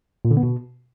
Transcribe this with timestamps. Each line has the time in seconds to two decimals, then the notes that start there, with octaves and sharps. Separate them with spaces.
0.25 A#2
0.31 D3
0.37 B3
0.43 B2